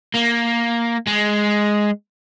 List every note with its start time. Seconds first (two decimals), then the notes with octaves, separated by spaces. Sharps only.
0.15 A#3
1.07 G#3